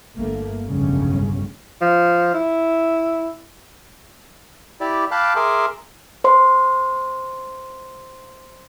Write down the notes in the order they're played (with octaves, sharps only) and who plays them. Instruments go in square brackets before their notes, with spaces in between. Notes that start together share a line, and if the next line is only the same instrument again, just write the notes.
[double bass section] G1 A3 A#3
F1 B1 G2 C#3 G3 C#4
[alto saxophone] F3
E4
[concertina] E4 G4 D5
F5 G5 A5 B5 D6 F#6
G#4 A#4 E5 C6 D6
[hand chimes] C5 C6